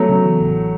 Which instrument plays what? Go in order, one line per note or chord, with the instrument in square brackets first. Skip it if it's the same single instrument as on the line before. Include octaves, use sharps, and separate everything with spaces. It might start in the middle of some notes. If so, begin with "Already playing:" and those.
Already playing: [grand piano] F#3 A3 [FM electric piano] B3
[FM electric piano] C#3
E3
A1